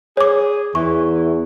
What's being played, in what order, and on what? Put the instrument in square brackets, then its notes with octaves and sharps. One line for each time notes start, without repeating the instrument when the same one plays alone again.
[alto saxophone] G#4 [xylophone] C#5 D6
[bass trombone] E2 [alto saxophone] E3 [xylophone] C#6